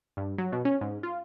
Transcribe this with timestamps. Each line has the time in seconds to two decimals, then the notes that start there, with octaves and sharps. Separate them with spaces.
0.17 G2
0.38 F#3
0.52 B2
0.65 C#4
0.81 G#2
1.03 F4